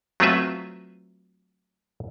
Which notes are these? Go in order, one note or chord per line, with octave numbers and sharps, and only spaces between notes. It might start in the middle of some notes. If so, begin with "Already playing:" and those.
F#3 A3 C4 F4 B4 E5